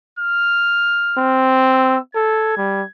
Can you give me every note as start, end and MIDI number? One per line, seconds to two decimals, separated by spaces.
0.19 1.44 89
1.17 1.98 60
1.72 2.00 88
2.15 2.53 69
2.15 2.90 92
2.57 2.83 55